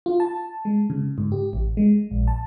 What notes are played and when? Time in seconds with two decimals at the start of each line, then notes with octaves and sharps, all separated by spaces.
0.06 F4
0.20 A5
0.65 G#3
0.90 C#3
1.18 G#2
1.32 G4
1.53 A1
1.77 G#3
2.11 A#1
2.28 A5